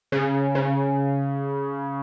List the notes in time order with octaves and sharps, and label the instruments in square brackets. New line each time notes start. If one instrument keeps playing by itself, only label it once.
[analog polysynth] C#3
C#3